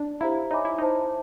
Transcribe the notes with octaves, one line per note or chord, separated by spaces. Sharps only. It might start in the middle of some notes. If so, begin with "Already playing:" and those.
Already playing: D4
E4 G4 C5 F5 A#5
D#4 C#5 E5 G#5 B5 D6
E4
D#4 C5 E5 A5